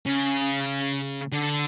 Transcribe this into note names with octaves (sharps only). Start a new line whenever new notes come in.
C#3
D3